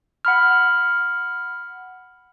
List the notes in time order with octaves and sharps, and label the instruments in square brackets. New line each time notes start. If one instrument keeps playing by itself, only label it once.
[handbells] F#5 B5 F6